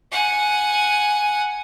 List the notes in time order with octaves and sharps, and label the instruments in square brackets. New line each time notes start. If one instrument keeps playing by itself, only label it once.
[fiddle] F#5 G#5